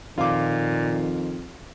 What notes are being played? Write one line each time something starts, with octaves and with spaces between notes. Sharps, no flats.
F2 A#2 D#3 F4 D6